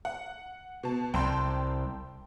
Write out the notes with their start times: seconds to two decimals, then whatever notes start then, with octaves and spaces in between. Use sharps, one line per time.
0.05 F#5
0.83 B2 A5
1.14 C2 G5 A5 C6